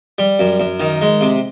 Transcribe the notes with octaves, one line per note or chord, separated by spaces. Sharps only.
G3
F#2
F#2
D#3
G#3
C3